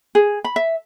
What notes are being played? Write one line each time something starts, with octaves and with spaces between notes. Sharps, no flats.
G#4
B5
E5